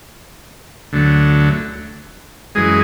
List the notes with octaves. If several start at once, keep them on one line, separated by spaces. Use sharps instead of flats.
D2 D3 F#3 A3
F#2 E3 G#3 G#4